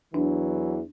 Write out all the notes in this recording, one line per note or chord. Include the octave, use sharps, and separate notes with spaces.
E2 E3 F#3 D4